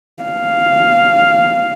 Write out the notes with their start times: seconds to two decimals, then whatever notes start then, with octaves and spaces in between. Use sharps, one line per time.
0.23 F5